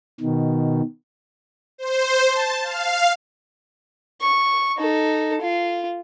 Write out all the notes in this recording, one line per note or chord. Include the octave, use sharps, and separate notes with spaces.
B2 D#3
C5
A5
F5
C#6
D#4 A4
F4